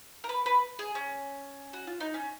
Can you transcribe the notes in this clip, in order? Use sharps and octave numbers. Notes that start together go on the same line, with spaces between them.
A#4
B4
B4
G#4
C#4
F#4
F4
D#4
C#4